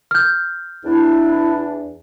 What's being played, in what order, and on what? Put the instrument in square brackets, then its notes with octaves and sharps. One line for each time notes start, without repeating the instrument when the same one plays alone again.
[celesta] F6 G6
[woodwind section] E2 D4 [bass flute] E4